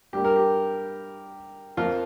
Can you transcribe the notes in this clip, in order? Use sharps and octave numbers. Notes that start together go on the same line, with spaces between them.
G2 G3 A#3 G4
A#4
G4
F2 F3 A#3 F4